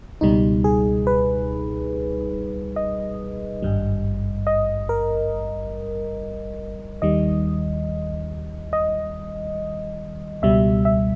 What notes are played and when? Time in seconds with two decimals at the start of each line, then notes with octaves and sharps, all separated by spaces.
0.21 C#2 B2 G3 D#4
0.64 G#4
1.07 B4
2.76 D#5
3.62 G#1 G2 G3
4.47 D#5
4.89 A#4
7.02 D#2 D#3 G3 D#5
8.73 D#5
10.42 C#2 B2 G3 E5
10.85 E5